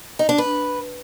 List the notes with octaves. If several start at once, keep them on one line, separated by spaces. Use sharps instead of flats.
D#4
D4
B4